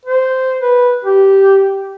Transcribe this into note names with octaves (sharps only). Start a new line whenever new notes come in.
C5
B4
G4